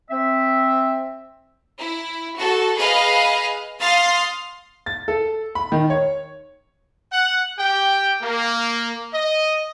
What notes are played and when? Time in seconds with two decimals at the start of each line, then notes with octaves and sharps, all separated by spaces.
0.10 C4 E5
1.78 E4
2.37 F#4 A4
2.77 G#4 B4 D#5 F5
3.80 F5 C6 D#6 F6 A6
4.86 A6
5.08 A4
5.55 B5
5.72 D#3
5.90 C#5
7.13 F#5
7.59 G4 G5
8.22 A#3
9.14 D#5